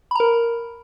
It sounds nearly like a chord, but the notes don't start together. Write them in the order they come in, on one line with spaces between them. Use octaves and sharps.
B5 A#5 A#4